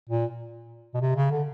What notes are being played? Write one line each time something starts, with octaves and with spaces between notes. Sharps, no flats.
A#2
B2
C3
C#3
D3